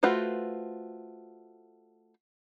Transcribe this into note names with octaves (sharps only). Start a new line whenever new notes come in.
A3 F4 F#4 B4 C5